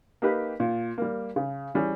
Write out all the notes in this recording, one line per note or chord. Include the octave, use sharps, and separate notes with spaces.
A#3 D#4 G4 B4
A#2
G3 A#3
C#3
E3 G3 C#4 G#4